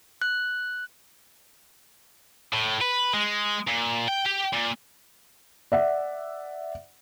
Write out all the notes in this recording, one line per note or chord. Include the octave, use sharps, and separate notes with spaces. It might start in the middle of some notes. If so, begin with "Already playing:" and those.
F#6
A2
B4
G#3
A#2
G5
G4
A#2
D5 E5 F#5